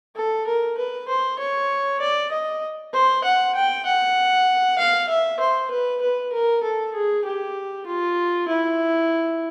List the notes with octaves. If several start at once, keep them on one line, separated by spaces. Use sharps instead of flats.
A4
A#4
B4
C5
C#5
D5
D#5
C5
F#5
G5
F#5
F5
E5
C5
B4
B4
A#4
A4
G#4
G4
F4
E4